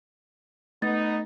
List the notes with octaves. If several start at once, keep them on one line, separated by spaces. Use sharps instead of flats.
A3 B3 D#4 A6